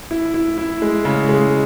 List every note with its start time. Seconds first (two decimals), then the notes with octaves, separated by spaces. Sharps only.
0.11 E4
0.34 E4
0.58 E4
0.82 G#3
1.05 C#3
1.29 G#3